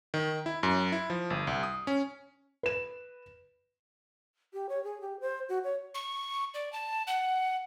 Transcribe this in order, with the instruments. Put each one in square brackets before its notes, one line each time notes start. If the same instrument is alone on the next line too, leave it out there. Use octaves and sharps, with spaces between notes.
[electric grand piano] D#3
E4
F#2
E4
F3
G1
C2
D#6
C#4
[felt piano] B4 E7
[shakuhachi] G4
C#5
G#4
G4
C5
F#4
C#5
[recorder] C#6
D5
A5
F#5